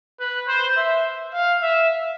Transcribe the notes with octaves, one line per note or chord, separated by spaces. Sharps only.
B4
C5
E5
F5
E5